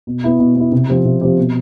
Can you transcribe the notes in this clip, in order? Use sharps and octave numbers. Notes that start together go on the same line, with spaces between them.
B2
B3 E4
B2
B3 E4
C3
F3 C4 G4
C3
F3 C4 G4
B2